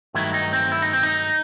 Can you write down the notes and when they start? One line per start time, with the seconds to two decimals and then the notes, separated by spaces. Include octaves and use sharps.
0.14 G2 D#3 F#3 A3 E4
0.34 D#4
0.53 C4
0.72 E4
0.82 D#4
0.93 C4
1.03 D#4